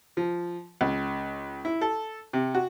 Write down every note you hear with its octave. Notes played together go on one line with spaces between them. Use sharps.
F3
C#2
E4
A4
C3
F#4